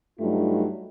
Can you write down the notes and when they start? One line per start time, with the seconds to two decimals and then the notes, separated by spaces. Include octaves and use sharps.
0.20 G2 F#3 A3 D#4 F4